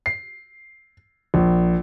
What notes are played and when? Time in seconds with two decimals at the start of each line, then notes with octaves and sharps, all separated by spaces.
0.06 C7
1.34 A#1